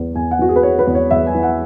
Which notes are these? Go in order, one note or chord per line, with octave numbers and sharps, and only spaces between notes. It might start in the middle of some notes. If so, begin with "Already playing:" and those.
Already playing: E2 B3
E2 G#5
F#5
E3 F#4
G#4
B4
B3 C#5
B4
E2
C#5
E2 E5
G#5
E3
F#5